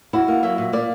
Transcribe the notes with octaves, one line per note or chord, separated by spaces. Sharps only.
E4 F#4
A#3
F#3 E5
A#2
A#3 D5